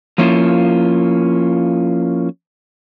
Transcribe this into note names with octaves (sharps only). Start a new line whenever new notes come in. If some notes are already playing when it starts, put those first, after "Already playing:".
F3 A#3 C#4 E4 F4